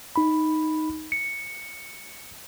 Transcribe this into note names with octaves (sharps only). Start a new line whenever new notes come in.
D#4 B5
C#7